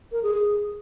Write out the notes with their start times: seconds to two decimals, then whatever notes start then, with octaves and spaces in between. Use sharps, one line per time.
0.12 A#4
0.23 G#4
0.34 G#4